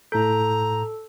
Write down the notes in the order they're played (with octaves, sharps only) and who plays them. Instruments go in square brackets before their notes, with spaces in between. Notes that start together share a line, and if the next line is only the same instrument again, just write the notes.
[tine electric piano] A2 G6 [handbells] A4 [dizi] A#5